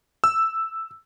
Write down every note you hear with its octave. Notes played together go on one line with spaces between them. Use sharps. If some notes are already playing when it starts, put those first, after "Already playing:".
E6